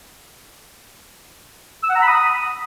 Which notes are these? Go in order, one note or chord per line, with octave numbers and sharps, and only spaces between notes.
E6
F#5
A#5
B5
D#6